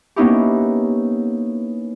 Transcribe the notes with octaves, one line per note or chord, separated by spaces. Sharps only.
A#3 B3 C#4 D#4 E4 G4